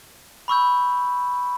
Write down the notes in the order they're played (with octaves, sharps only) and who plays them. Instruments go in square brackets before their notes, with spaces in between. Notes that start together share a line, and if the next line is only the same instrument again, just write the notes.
[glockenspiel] B5 C#6 E6 G6